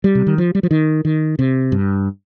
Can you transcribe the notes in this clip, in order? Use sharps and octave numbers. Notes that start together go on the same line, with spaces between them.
G3
C3
D#3
F3
G3
F3
D#3
D#3
C3
G2